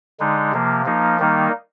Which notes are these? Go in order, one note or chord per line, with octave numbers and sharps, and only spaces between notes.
D3 G#3 D#4
C3 F3 A#3
F3 A#3 D#4
D#3 G3 A#3 D#4